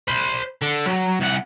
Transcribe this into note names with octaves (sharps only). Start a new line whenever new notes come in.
C5 B5
D3
F#3
C2 F#5